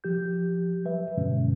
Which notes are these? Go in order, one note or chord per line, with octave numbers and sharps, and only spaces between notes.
F3 G4 G6
F#3 B4 E5
G2 B2 D3 F#3 G#3 C#4